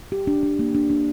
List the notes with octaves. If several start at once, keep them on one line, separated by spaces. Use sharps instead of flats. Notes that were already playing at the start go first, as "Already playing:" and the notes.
G4
D4
D4
A#3
D4
D4